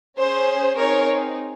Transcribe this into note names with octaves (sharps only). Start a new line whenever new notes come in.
C#4 G#4 C5
C4 D#4 G#4 A#4 C#5